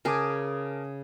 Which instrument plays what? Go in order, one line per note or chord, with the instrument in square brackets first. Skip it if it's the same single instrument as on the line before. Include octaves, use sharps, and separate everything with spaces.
[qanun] C#3 G#4 [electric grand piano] A#4 A5 D6